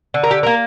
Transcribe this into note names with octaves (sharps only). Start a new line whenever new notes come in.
D3
A#4
G4
A#3 A#4